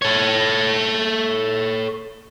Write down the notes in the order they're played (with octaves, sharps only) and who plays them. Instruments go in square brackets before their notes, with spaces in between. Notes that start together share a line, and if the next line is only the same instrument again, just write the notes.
[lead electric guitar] A4 C#5